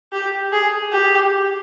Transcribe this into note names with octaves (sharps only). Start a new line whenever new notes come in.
G4
G#4
G4